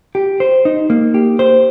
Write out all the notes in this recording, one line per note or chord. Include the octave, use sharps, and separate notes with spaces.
G4
C5
D#4
A#3
G4
C5